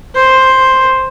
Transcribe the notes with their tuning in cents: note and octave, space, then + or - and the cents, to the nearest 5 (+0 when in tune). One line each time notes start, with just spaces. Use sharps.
C5 +5